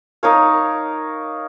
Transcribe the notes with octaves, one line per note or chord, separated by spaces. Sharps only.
D#4 A#4 C#5 F5